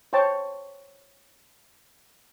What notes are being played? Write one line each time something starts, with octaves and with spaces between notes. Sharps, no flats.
C5 C#5 G5 A5